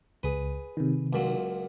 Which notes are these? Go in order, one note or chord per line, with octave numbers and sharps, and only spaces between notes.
C#2 G#4 B4
C3 D#3
C#2 A#2 F#3